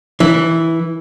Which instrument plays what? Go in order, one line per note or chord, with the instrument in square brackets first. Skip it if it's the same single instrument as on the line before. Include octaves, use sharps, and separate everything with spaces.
[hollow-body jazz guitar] E3